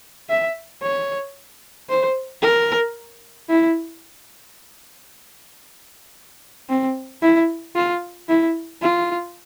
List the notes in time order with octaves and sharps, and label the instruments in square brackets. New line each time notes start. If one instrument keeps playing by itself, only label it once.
[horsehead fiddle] E5
C#5
C5
A#4
E4
C4
E4
F4
E4
F4